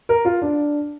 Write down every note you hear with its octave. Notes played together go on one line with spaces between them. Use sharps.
A#4
F4
D4